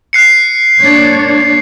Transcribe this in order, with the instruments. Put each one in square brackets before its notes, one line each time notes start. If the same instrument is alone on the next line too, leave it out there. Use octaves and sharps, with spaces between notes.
[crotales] F#6 C7 C#7
[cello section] A#3 D4 C#5